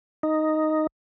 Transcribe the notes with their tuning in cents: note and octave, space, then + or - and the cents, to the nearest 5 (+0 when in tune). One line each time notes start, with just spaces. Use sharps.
D#4 +0